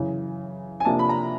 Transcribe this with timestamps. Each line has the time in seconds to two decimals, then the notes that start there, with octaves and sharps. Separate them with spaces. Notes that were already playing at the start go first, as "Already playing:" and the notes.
Already playing: F#2 C#3 E3
0.80 G#5
0.85 C3 F3 A#3 D4 A5
0.99 B5
1.09 A#5